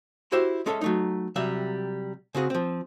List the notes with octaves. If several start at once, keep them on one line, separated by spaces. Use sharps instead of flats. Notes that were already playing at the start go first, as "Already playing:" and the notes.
E4 F#4 G4 C5 E5
G#3 C#4 A4 C#5 E5
F#3 A3 D#4
C3 F#3 G3 E5
C#3 C4 F#4 G#4
F3 C4